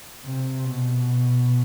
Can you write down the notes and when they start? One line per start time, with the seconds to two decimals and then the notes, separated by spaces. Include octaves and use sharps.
0.25 C3
0.64 B2